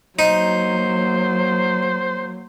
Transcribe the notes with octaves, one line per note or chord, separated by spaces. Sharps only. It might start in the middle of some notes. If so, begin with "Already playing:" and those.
F#3 A#3 D#4 C5